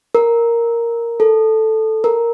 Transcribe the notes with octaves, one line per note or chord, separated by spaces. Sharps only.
A#4
A4
A#4